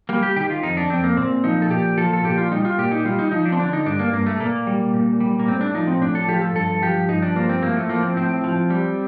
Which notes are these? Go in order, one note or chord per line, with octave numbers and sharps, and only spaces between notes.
G3 A#3
G4
D#3 G4
F4
F2 D#4
D4
F2 C4
A#3
A#2 C4
F3 D#4
A4
A#2 G4
F3 A4
A4
A#2 G4
F4
G3 D#4
F4
A#2 G4
D#4
G3 F4
D#4
F3 D#4
D4
C4
D3 D4
D#4
G2 D4
A#3
G2 A#3
A3
A#2 A#3
G3
A#2
G3
A#3
A2 C4
D4
F3 D#4
C4
A2 D4
A4
F3 G4
A4
G2 A4
F3 G4
G2 D#4
D4
F3 A#3
C4
A2 A#3
A3
F3 A#3
C4
A2 C4
F3
G3